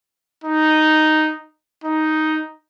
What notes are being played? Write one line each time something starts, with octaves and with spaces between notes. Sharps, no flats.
D#4
D#4